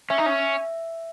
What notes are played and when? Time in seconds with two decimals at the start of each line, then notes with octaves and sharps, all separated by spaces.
0.10 C#4 E5
0.18 D#4
0.26 C#4